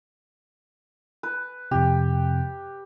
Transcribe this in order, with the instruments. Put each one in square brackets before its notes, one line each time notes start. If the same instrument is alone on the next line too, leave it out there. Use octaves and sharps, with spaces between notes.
[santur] B4
[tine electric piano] F2 C3 [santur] G4